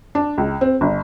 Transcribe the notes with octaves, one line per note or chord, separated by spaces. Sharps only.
D4
C#2
C4
G1